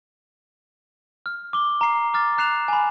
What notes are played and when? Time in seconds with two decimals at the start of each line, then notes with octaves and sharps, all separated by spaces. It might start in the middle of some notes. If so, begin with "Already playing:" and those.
1.26 F6
1.53 D6 G7
1.81 A#5 C7
2.14 D6 F6 A6
2.38 A#5 F#6 C7 E7 F7
2.68 G#5 B5